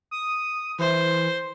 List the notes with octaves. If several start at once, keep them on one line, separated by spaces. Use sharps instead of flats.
D#6
E3 C5